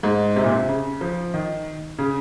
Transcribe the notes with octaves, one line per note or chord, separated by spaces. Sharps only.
G#2
C3
A#2
C3
C#3
F3
D#3
C#3